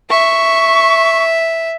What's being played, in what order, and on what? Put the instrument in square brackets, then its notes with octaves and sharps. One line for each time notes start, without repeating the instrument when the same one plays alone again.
[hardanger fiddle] E5 [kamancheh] C#6